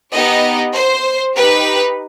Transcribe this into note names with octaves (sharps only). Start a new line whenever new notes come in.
B3 D#4 G4 D#5
C5
D#4 G4 B4